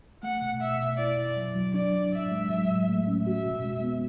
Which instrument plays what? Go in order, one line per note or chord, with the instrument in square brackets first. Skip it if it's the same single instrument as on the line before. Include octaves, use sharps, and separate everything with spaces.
[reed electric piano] A3 [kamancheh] F#5
[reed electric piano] B2
[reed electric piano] B2 [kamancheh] E5
[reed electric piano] B2
[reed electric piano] E4 [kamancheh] D5
[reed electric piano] E4
F#3
F#3
[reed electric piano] D4 [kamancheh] D5
[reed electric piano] D4
[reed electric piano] A2 [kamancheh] E5
[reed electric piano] G#3
F#3
A2
A3
C#4
[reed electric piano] F#4 [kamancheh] E5
[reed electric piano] B2
G#3
B3